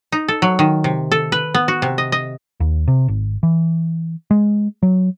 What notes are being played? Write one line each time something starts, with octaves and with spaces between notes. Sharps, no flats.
D#4
A4
F#3
D#3
C3
A4
B4
B3
F#4
C3
D#5
D#5
D#2
C3
G#1
E3
G#3
F#3